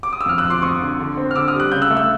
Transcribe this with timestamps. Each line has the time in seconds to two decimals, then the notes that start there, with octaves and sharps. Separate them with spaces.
0.03 D6
0.13 D#6
0.21 E6
0.26 F2 F6
0.38 E6 F#6
0.44 F3
0.50 C6 D6
0.62 F2 C#6 D#6
0.80 D3
0.99 D3
1.17 C4
1.31 F6
1.35 D3 D6 E6
1.48 D#6 F6
1.54 G3
1.60 F#6
1.72 C#3 G6
1.82 E6 F#6
1.91 A3
1.97 E6